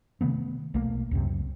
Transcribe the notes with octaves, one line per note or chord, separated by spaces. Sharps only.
C3 D#3 A3 B3
B1 A3 A#3
C#2 F#2 C3